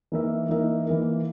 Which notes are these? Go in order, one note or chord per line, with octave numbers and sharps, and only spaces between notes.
E3 A#3 D#4 A#4 E5
E3 A#3 D#4 A#4 E5
E3 A#3 D#4 A#4 E5